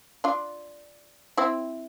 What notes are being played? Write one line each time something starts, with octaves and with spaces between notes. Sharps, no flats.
D4 F4
C4 E4